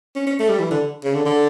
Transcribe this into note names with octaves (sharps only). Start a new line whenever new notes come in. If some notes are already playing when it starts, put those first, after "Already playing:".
C#4
C#4
A3
G3
E3
D3
C#3
D3
D3